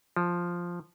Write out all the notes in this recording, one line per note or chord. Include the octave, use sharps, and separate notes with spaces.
F3